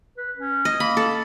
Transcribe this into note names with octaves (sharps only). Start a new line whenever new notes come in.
B4
C#4
D#5
A#3 B5
A4